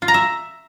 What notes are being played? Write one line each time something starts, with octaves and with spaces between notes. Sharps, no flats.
F4
A#5
E5